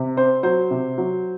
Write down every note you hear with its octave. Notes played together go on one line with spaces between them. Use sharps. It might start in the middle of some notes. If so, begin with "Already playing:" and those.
Already playing: C3
C4 C5
F#3 C5
C3
F#3